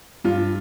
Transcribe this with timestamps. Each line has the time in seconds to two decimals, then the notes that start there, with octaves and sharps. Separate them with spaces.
0.24 G2 F4